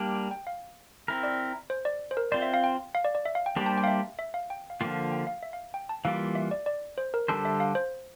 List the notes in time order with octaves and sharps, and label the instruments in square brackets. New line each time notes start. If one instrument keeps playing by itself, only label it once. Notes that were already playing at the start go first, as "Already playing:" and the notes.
Already playing: [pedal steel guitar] G3 A#3 D4
[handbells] G5
G5
F5
[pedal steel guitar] C4 E4 A#4
[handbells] D5
C5
D5
C5
A#4
[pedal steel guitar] C4 F4 C5 [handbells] D5
[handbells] E5
F5
G5
F5
D5
D5
E5
F5
G5
[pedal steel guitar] G3 A#3 D4 G4 C5 [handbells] G5
[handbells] A5
G5
F5
E5
E5
F5
G5
F5
[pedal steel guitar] D3 F3 A#3 F4 [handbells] G5
[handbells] G5
F5
E5
F5
G5
A5
[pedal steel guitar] E3 G3 A#3 F4 [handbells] F5
[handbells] E5
D5
D5
C5
A#4
[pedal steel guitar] D3 G3 D4 A4 C5
[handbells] E5
F5
C5